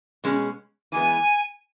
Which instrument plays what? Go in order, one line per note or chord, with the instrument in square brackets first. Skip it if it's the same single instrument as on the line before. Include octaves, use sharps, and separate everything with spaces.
[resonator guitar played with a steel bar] B2 G#3 C#4
[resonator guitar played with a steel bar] E3 G#3 B3 [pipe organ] G#5